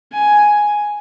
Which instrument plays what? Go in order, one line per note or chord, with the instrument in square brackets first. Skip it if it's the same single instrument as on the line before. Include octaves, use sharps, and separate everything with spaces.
[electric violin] G#5